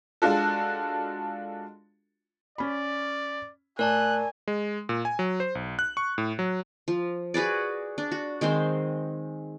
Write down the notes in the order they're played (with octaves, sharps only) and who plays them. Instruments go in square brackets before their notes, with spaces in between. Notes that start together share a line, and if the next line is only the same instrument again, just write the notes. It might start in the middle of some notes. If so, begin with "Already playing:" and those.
[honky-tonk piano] G#3 D4 F4 F#4 A4
[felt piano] C#4 B5 [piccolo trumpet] D5
[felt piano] A2 [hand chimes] A#4 D5 A5 [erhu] G#5 [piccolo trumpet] F#6
[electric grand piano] G#3
A#2
G#5
F#3
C5
B1
F#6
C#6
A2
F#3
[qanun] F3
F#4 G#4 B4 D5
D4
F#4
D#3 G#3 C4 C5